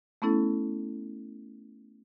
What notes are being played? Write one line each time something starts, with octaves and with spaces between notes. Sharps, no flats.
A3 B3 C#4 E4 A4